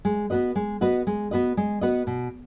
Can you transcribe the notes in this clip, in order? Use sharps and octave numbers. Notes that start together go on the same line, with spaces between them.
G#3
B3 F#4 B4 D#5
G#3
B3 F#4 B4 D#5
G#3
B3 F#4 B4 D#5
G#3
B3 F#4 B4 D#5
B2